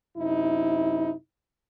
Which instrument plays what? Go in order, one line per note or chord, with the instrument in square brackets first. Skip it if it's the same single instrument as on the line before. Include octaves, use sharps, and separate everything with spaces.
[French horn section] F#2 C3 D#4 E4